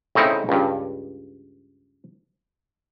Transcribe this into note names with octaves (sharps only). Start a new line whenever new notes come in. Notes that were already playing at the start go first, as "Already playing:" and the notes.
A2 C#3 C4 D#4 E4
C#2 G2